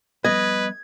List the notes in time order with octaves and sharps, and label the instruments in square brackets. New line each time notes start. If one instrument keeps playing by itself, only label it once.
[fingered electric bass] F3 G3 B3 [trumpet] B4 [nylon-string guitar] D#5 [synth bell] G#6